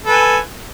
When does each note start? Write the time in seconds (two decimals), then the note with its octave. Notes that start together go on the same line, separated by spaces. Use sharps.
0.06 A4
0.08 B4
0.11 G#5